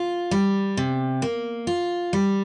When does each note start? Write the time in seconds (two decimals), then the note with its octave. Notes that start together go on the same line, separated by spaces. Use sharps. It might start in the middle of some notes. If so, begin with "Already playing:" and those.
Already playing: F4
0.31 G3
0.77 C3
1.22 A#3
1.67 F4
2.13 G3